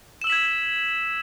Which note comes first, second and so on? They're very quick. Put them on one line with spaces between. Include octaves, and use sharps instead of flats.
E7 E6 F#7 B6 G#6